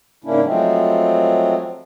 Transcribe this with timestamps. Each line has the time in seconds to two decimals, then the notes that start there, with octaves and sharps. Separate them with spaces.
0.24 G#2 C#3 A#3 C#4 D4 E4
0.44 F3 F#3 G#3 A3 C4